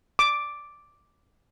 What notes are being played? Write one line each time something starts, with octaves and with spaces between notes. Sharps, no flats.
D6